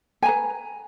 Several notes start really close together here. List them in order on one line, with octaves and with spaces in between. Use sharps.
G#5 A#5 B4